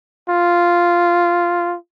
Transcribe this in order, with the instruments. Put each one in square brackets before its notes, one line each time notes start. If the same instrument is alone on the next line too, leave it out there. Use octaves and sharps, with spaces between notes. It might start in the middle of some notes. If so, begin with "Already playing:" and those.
[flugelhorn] F4